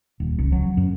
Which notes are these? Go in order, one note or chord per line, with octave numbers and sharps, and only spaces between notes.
D#1
C#2
F#3
F#2